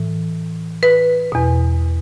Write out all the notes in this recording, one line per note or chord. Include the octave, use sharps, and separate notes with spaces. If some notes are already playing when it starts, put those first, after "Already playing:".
Already playing: A2 E3
B4
E2 B2